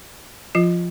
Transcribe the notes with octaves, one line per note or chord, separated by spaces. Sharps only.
F3 F4